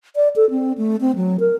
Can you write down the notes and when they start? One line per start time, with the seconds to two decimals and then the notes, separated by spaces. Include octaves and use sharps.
0.16 D5
0.36 A4
0.50 C4
0.78 A3
1.01 C4
1.16 F#3
1.40 A#4